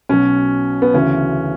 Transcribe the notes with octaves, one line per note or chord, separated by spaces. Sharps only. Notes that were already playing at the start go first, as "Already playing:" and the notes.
B1 B2 C#4
B3
D2 C#3 E3 C#4